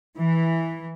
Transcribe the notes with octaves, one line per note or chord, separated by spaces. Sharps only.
E3